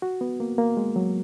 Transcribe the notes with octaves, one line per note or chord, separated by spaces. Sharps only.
F#4
B3
A#3
A#3
G#3
F#3